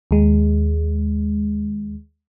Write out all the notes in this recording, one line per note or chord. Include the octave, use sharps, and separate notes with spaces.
D#2 G#3